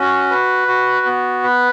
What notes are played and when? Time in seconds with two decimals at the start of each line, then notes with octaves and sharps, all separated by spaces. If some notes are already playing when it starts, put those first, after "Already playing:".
Already playing: C#4 F#4
0.30 B4
0.68 F#4
1.06 B3
1.44 B4